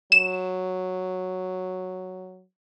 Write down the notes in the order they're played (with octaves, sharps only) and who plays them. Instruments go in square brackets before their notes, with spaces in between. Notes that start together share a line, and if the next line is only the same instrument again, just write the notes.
[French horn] F#3 [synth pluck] E7